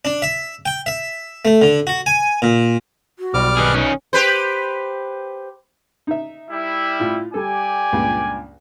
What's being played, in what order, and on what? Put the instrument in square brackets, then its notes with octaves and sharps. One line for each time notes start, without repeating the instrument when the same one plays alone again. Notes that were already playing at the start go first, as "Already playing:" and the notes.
[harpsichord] D4
E5
G5
E5
A3
D3
F#4
G#5
A#2
[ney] F#4
[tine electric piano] B1 B2 [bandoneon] G3 D6 F6
[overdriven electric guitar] D#3 G#4 [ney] B4
[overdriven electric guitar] D#3 C#4
[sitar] G4 B4 C5
[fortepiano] D#4 E5
[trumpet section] G3 E4
[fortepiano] A2 F4
[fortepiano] G3 A4 [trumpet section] G4 D5 G#5
[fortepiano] C#2 G2 A#2